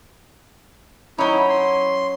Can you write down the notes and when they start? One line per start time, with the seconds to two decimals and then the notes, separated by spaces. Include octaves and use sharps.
1.18 F#3 C#4 D#4 E4
1.50 C6